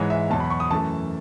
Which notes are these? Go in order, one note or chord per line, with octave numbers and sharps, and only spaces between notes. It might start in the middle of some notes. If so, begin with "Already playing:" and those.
Already playing: G#2 E3 G#3 C#5
E5
E2 B2 F#3 A5
B5
C#6
D#6
F#2 E3 A3 A5